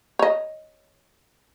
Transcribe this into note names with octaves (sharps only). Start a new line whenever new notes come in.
C#5 D#5